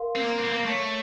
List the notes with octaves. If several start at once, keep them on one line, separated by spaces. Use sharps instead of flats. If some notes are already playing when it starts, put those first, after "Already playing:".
Already playing: A#4 F5 C6
C4
A#3
C4
A#3
A3 C#5 A5 C#6